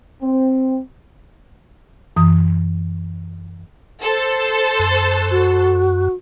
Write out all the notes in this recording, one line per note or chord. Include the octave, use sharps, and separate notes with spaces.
C4
F#2 E3 D#6
A4 C5
F#2
F#4